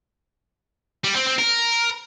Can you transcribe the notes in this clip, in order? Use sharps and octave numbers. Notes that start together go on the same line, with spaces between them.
G3
C4
C4
A#4